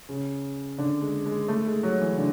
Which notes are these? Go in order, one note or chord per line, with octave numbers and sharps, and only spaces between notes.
C#3
D3
G#3
G#3
A3
G#3
F#3
E3
D3